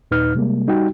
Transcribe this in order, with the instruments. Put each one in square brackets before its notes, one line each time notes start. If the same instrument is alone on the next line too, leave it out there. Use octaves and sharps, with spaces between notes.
[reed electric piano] D#2 A#2 D#4 B4 F6
C3 G3 G#3 A#3
G3 D#4 F#4 G4 G5